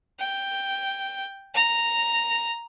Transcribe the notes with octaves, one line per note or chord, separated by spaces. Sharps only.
G5
A#5